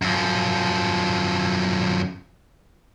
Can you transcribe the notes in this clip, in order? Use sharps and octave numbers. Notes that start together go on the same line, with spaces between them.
F#2 F3